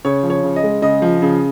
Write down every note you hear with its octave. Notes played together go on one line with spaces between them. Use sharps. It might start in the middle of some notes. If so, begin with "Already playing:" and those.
C#3 C#5
F3
C#5
C#3
D#5
G#3
C#3 D#5
F3
C#3